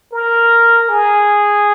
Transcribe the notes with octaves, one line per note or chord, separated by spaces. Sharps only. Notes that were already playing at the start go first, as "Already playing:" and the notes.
A#4
G#4